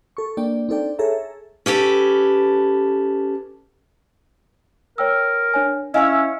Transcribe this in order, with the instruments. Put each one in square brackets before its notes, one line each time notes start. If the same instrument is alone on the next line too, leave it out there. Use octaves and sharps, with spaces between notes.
[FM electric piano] A4 C#6
A#3 D4 D5 G5
C4 D4 D#4 A4 D5 G5
G#4 A4 C#5 E5 A#5
[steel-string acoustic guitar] C#4 G4 A4 B4
[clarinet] A#4 [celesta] C#5 G5 E6
[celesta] D4 C#5 G#5
[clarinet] C#4 [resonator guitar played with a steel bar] E4 C#5 [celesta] D#5 F5 G#5